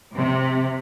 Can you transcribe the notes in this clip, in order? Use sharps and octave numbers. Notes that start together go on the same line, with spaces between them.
C3